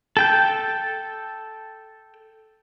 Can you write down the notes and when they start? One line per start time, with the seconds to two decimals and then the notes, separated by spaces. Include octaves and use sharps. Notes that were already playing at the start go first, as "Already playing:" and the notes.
0.17 A4 G5 G6